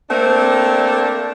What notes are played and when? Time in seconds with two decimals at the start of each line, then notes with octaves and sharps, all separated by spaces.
0.10 A3 A#3 C4 D4